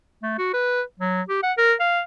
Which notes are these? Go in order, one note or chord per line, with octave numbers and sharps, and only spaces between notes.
A3
F#4
B4
F#3
G4
F#5
A#4
F5